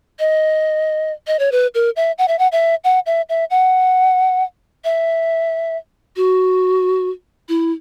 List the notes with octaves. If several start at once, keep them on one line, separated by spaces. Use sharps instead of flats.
D#5
D#5
C#5
B4
A#4
E5
F#5
E5
F#5
E5
F#5
E5
E5
F#5
E5
F#4
E4